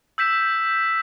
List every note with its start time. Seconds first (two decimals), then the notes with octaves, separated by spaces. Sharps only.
0.18 E6 G6 B6 E7